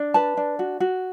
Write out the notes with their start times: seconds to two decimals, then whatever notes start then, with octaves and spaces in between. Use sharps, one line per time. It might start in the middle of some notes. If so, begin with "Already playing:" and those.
Already playing: D4
0.14 B4 A5
0.37 D4
0.59 F#4
0.80 F#4